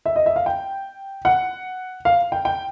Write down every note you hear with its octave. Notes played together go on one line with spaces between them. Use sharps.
E5
D#5
E5
F5
G5
F#5
F5
G5
G5